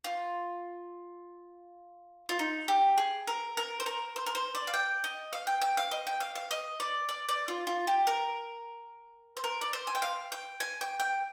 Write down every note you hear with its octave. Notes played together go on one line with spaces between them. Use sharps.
F4
F4
D#4
G4
G#4
A#4
A#4
C5
A#4
C5
A#4
C5
D5
F5
G5
D#5
F5
G5
G5
F5
D#5
G5
F5
F5
D#5
D5
D5
D5
F4
F4
G4
A#4
C5
A#4
D5
C5
G#5
G5
F5
G5
G#5
G5
G5